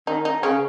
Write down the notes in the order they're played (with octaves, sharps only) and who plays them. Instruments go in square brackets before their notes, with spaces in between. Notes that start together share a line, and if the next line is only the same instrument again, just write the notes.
[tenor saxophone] D#3 [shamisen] D#4
[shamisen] D#4
[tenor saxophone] C#3 [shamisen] C#4